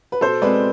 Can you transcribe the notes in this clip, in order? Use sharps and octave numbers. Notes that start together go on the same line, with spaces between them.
B4
B2 A4 C5
G#3 C4 B4 D5